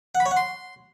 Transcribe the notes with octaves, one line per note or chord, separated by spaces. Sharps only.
F#5
B5
C#5
F#5
C6